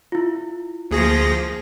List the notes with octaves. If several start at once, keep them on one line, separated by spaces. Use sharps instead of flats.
E4 F4
D2 F3 A#3 G#4 A#6